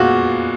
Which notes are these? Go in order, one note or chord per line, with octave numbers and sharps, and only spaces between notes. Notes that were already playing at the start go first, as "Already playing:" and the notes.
Already playing: A#2 G#3 B3 F4 F#4